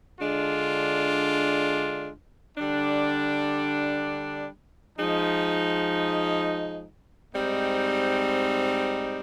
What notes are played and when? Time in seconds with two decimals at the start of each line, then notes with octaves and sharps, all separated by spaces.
0.20 D3 G#3 D4 F4
2.57 D3 G3 D4
4.95 F3 G#3 D#4
7.33 G#2 G3 C4 D#4